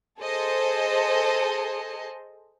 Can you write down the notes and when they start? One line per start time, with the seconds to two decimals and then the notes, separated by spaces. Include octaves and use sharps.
0.19 G#4 A4 C5 D#5